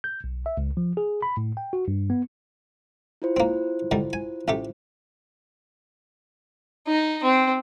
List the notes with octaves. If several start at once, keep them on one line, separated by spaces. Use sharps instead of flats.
G6
B1
E5
C#2
F3
G#4
B5
A2
G5
F#4
G2
B3
E4 F4 C5
A#3 C4
D3 D#3 G3
G#5
A1 A3 G4
D#4
C4